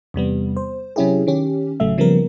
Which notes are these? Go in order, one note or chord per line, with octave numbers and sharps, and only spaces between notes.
E2 C3 G3 B3
C5
C3 F#3 C#4 E4 G4 G#4
D#3 C#4 G4
A1 C#3 F#3 A3 E5
C#3 F3 G3 A#3 B3 A#4